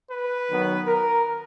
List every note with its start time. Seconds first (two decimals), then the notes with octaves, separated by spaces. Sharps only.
0.10 B4
0.48 D#3 F#3 B3
0.88 A#4